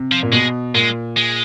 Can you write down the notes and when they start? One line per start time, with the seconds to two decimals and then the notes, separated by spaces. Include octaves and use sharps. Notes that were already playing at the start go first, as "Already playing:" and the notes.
Already playing: C3
0.12 F3
0.23 A#2
0.32 B2 G#3
0.74 A#2 G#3
1.17 G#3